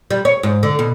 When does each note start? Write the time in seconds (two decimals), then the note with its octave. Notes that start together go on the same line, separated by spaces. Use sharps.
0.11 G3
0.25 C#5
0.43 G#2
0.63 D3
0.79 B2